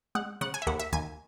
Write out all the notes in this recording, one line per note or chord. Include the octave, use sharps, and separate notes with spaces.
G#3 F#5
C#3 F#5
G#5
E5
D#2 F#5
E5
D#2 G#5